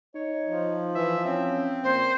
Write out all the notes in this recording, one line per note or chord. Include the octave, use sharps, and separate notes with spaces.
D#4 C#5
F3
E3 E5
C4 C#4
A#2 C5